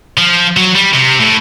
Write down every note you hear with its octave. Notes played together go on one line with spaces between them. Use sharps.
F3
F#3
G3
C3
A2